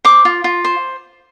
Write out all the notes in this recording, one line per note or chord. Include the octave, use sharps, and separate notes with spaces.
C5 D6
F4
F4
C5